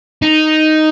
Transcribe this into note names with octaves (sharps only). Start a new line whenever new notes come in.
D#4